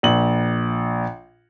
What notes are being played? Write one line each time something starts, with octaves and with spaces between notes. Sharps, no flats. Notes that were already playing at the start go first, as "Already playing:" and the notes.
A#1 F#7